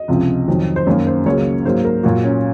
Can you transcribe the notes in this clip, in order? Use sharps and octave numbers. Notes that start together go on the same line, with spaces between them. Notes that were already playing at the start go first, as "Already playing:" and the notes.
Already playing: D#5
C#2 C3 F3
F2 D#3 F#3
C5
F#2 D#3 A#3 C#5
C5
C#2 C#3 F#3 A#3 C#5
G#2 F#3 A#3 C5
A#4
A#2 F#3 A#3 F#4
C#4